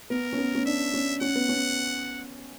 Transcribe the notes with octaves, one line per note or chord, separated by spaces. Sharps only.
B3 A#4
C#4
B3
C#4
D4 E5
C#4
C#4 F#5
B3
C#4